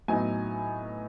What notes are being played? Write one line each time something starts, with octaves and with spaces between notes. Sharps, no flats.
A2 F#3 B3 D#4 G#5